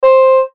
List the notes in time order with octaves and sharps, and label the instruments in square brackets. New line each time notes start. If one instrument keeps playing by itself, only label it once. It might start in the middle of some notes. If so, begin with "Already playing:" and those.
[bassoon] C5